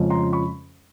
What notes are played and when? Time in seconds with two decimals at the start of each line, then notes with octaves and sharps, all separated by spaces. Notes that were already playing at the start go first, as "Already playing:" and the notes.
Already playing: F2 C#3 F3 G#3 C#4
0.10 A#5 C6
0.33 B5 C#6